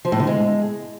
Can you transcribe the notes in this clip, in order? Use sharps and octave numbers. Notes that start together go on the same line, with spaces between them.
F3
A2
D3
G#3